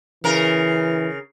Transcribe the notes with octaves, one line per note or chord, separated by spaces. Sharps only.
C#3 E3 A#4